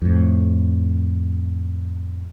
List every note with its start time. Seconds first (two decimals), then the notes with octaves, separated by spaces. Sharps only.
0.02 F2 A2